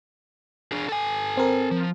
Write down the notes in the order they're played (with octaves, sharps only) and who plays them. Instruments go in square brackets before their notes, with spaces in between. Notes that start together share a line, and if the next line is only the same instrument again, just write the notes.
[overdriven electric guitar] D4 G#4
A4 G#5
[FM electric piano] C4 A#4
[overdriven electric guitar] F3